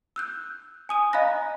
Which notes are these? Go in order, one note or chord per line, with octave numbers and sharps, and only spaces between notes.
E6 F#6 G6
G#5 D#6 D#7
D#5 F5 A#5 B5 F#6 A#6